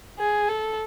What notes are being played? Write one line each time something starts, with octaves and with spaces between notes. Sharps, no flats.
G#4
A4